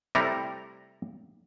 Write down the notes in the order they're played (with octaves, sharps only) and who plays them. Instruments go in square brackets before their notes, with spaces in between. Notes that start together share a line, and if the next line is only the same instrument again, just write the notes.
[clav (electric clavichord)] C3 G3 A3 E4 A#5